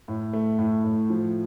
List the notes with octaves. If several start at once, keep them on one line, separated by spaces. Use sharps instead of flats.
A2
A3
A2
A2
F3